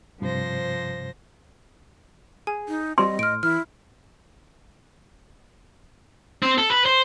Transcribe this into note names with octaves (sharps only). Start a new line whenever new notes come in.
G2 C3 F3 C5 A#6
G#4 G#5
D#4
G3 C4 D#5 C6
A2 F6 D7
E3 E4 F6
C4
A4
B4
C5